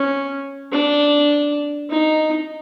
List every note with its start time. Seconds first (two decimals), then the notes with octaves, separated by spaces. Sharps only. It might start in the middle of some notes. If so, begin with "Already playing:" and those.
Already playing: C#4
0.72 D4
1.90 D#4